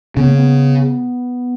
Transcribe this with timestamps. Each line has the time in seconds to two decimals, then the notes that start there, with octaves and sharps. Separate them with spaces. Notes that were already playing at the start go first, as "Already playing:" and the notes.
0.17 C#3 B3
0.28 A#3
0.38 B3